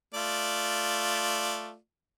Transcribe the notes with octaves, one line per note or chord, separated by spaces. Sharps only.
A3 F4 D5